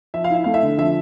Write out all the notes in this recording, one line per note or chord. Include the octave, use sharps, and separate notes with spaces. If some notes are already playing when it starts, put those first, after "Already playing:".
F3 E5
F5
E4 E5
A3 F5
E5
D3
F3 E5